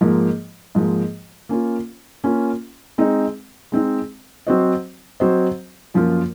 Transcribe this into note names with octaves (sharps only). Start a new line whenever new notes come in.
G#2 F3 A#3
G#2 F3 A#3
A#3 C#4 F4
A#3 C#4 F4
G#3 C4 D#4
G#3 C4 D#4
F#3 C4 F#4 C5 D#5
F#3 C4 F#4 C5 D#5
F#2 F3 A#3 F4